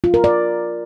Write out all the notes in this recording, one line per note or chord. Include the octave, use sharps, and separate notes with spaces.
F4
A#4
D5